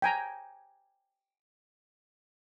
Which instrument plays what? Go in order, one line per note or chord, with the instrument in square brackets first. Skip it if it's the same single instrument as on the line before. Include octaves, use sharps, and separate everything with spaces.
[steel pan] G5 G#5 A#5